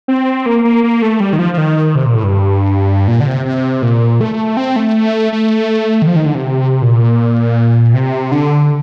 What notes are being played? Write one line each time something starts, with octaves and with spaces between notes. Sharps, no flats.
C4
A#3
A#3
A#3
A3
G3
D#3
F3
F3
D#3
C3
A#2
A2
G2
A#2
D3
C3
C3
A#2
A3
C4
A3
A3
D#3
F3
D#3
D3
C3
A#2
C3
D3